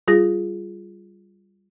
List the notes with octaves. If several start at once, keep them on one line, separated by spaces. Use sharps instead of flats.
G3 F4 G#4 A#6